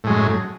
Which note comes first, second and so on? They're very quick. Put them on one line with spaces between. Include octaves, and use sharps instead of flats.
A2 G#3 F#2